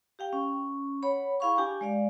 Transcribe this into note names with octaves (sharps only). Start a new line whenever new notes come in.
G4 F5 G5
C#4
C#5 F#5 B5
E4 G#4 F5 B5 C#6
D4 G4 G5 G#5
G#3 D5 F5